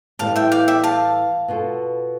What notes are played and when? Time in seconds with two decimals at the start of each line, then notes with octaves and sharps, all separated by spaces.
0.19 A2 E3 G3 F5 A5
0.36 E5 G5
0.52 D5 F5
0.68 E5 G5
0.84 F5 A5
1.48 B2 B3 F4 A4